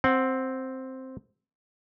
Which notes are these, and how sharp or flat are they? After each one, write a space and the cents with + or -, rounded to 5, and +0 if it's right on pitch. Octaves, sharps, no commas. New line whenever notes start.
C4 +0 F#5 +0